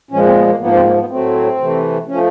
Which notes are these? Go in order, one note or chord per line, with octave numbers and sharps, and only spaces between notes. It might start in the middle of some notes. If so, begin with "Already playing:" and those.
A#2 F3 G#3 C#4
C4
B3
A#3
G#2 F3 A#3 B3
C4
A#3
B3
A2 F#3 A3 C4
C3 E3 A3
F3 A3 C#4